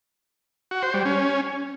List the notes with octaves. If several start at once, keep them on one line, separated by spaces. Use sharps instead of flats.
F#4
C5
G3
C#4